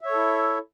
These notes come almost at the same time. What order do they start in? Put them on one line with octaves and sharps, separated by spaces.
E5 C#5 A4 E4